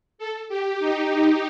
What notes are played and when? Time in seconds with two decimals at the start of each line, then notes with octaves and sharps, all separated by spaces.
0.18 A4
0.49 G4
0.80 D#4